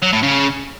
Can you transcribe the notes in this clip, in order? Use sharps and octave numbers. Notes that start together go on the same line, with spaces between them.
F#3
A2
C#3